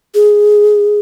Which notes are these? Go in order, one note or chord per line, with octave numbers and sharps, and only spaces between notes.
G#4